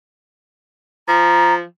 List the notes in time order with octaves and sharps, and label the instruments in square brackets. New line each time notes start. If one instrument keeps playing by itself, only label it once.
[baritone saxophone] F3 [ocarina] A#5